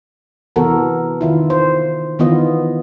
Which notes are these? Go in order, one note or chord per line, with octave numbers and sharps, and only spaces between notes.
C3 E3 B3 F#4 A4 A#4
D#3 E4 F4
C5
D#3 E3 B3 F4 D#5